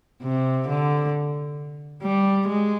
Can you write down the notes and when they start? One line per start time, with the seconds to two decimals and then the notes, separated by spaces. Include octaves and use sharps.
0.23 C3
0.68 D3
2.03 G3
2.48 G#3